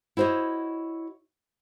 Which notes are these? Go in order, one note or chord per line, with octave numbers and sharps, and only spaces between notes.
E4 F#4 C5 C#5 D#5